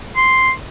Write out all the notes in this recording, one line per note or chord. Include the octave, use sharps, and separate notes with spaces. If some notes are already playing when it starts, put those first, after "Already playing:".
C6